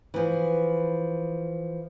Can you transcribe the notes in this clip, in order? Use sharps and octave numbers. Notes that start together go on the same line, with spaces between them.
E3 F3